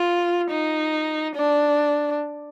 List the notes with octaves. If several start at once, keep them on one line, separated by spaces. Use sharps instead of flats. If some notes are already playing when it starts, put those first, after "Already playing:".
Already playing: F4
D#4
D4